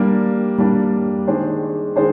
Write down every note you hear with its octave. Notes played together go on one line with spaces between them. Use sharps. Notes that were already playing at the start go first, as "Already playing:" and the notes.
Already playing: G3 A#3 D4
G3 A#3 D4
D#3 G#3 D4 G#4 C5
D#3 G#3 D4 G#4 C5